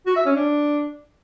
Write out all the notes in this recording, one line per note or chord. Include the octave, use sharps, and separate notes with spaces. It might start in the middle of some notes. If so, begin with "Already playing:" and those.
F#4
E5
C#4
D4